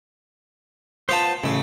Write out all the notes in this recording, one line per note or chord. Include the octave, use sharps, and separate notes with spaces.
B3 F4 C5 A5
A1 C#3 A3